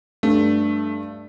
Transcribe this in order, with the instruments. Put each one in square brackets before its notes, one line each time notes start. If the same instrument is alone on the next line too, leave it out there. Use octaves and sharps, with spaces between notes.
[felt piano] G2 [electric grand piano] A3